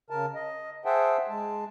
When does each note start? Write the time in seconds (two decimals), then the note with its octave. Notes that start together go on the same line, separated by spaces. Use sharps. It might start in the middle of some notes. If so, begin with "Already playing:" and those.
0.10 C#3 A#4 A5
0.35 D#5
0.85 G#4 C5 E5 F#5 G5 A5
1.29 G#3 A5